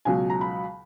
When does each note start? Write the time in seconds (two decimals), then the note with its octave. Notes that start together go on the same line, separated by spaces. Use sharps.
0.05 C#2 B2 F#3 G#5
0.30 A#5
0.41 B5